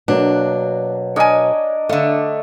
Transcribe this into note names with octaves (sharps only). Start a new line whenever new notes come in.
B2 F#3 A#3 D4
D4 A#4 C#5 D#5 G#5
D3 A3 F5